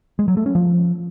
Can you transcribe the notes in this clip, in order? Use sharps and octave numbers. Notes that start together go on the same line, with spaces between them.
G#3
F#3
A3
C#4
F3